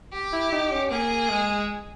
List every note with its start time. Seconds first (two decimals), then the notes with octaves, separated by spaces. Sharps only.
0.13 G4
0.33 E4
0.52 D#4
0.72 C#4
0.90 A#3 G#4
1.30 G#3